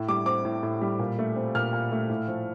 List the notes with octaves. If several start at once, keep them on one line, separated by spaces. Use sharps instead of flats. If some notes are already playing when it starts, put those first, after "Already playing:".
Already playing: A2
G3 D6
C4 D6
A2
A2
G3
A#2
A3
C4
A#2 F6
A#2
A3
A2
F3